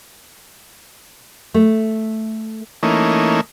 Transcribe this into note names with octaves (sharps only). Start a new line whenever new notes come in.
A3
E3 A3 A#3 C#4 D#4